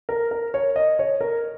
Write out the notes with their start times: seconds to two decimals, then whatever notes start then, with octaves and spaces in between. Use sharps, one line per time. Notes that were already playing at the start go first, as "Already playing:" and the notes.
0.09 A#4
0.31 A#4
0.54 C#5
0.76 D#5
0.99 C#5
1.21 A#4